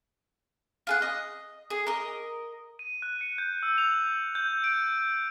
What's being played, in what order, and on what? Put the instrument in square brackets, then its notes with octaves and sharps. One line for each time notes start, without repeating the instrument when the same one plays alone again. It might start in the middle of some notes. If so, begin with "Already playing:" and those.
[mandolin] F4 G#4 F#5
D#5
G#4
A#4 D#5
[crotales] D#7
F#6
C#7
G6
E6
F7
G6
D7